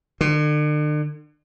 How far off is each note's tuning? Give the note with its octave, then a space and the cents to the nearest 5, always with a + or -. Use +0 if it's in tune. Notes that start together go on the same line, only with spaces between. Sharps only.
D3 +40